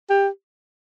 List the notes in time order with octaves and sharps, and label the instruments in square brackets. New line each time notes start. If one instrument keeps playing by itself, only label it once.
[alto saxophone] G4